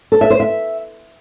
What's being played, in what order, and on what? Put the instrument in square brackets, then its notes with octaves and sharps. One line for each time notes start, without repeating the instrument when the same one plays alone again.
[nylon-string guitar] A4
E5
C5
E5